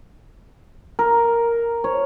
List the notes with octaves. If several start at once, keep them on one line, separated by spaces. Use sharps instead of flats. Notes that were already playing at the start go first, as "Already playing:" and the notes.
A#4
C#5